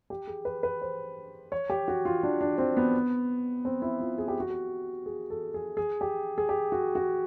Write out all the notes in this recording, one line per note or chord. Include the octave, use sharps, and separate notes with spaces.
G4
G#4
B4
B4
C5
C#5
G4
F#4
F4
D4
D4
C4
B3
C4
E4
F4
G#4
G4
F#4
G4
G#4
A4
G#4
G#4
G4
G#4
G4
F#4
F#4